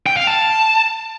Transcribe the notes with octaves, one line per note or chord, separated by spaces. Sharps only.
G5
F5
A5